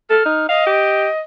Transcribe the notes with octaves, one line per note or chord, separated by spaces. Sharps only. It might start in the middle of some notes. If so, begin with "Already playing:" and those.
A4 F6
D#4
D#5 F5
G4